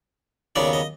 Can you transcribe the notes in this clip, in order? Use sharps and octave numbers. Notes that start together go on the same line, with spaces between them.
D#2 C#3 F#3 B3 D4 D5
D#5